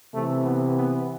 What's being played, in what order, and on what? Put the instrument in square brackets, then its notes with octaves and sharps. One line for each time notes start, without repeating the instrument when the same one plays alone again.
[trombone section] C3 E3 A3
B3
B3